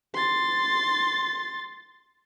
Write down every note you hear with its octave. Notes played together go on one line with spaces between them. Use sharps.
C6 A6